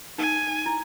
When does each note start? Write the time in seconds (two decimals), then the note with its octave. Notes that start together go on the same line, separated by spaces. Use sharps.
0.18 D#4 G#5
0.66 E4